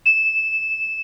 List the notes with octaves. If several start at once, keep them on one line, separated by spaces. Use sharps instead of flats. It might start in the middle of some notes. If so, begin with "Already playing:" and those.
E7